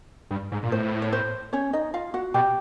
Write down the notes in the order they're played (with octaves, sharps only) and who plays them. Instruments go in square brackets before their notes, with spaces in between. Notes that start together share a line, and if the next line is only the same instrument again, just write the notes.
[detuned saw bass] G2
G#2
A#2
[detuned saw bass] A2 [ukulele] C5
[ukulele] C#5
C5
C#4 C#5
D#4 D#5
F4 F5
F#4 F#5
[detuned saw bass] B2 [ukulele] G4 G5